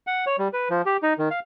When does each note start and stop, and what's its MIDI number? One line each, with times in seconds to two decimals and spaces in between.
0.07 0.25 78
0.26 0.36 73
0.38 0.48 55
0.53 0.69 71
0.70 0.82 53
0.86 0.97 67
1.03 1.13 63
1.18 1.29 51
1.31 1.40 77